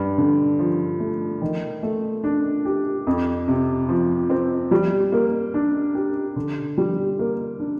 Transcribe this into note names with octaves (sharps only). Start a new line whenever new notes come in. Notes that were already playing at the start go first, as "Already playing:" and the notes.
Already playing: G2
D3
F3
A3
D#3
A3
D4
G4
F2
C3
F3
C4
G3
A#3
D4
G4
D3
G3
A#3
D4